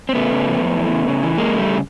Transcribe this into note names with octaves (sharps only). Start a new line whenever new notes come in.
C4
C#3 A3 B3
C#3
F2
F2
E3
C#3
C#3
E3
F2 G#3 A#3
C#3
G3 A3
C#3